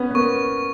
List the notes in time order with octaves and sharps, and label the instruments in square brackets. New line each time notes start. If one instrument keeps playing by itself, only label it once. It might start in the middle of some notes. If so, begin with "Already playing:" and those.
Already playing: [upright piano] B3 C#4
B3
[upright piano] A#3 [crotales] C#6